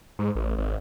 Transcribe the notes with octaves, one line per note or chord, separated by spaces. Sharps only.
G#2
A1
G#1